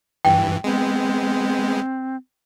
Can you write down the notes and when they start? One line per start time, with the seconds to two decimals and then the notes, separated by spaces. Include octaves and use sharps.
0.25 G2 E3 G5
0.64 G#3 B3 C4